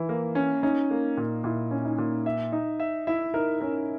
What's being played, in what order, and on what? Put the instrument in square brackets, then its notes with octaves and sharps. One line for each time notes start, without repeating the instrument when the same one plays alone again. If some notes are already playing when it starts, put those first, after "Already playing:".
Already playing: [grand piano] E3 [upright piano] E4
[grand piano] A#3
C#4
[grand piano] C#4 [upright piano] D#4
[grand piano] A#3
A#2
[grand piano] A#2 [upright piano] E4
[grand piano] C#4
[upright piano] D#4
[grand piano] A#2
E5
D#4
E5
[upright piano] E4 [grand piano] E5
[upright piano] D#4 [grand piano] A#4
[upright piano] C#4 [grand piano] A#4